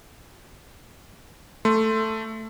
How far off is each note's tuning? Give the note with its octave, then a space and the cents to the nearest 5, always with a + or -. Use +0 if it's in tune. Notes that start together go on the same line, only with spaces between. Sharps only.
A3 +5 C6 +0